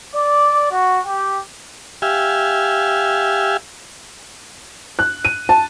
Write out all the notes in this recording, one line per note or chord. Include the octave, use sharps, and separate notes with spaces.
D5
F#4
G4
G4 E5 F5 G#5
F#6
D#7
A5